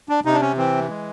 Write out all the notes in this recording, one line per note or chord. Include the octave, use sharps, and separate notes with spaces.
D4
C3 D#4
D4
C#4
E3 C4
G#3